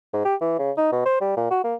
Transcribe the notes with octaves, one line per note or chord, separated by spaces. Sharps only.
G#2
G4
E3
C#3
D#4
B2
C5
G3
A#2
F#4
A#3